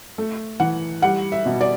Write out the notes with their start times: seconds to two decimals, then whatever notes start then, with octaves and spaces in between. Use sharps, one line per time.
0.18 A3
0.60 E3 F#5
1.02 G3 F#5
1.32 E5
1.46 B2
1.61 D5